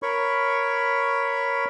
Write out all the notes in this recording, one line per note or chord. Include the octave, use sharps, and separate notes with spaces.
A#4 C#5 B5 C#6